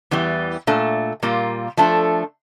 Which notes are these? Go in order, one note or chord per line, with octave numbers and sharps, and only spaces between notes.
E2 E3 G3
A#2 A3 D4
A#2 G3 A#3 F4
F3 A3 D4 A4